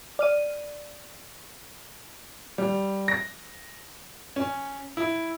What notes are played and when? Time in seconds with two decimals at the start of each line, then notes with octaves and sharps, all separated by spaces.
0.19 D5 F6 D#7
2.58 G3
3.08 A#6
4.36 C#4
4.97 E4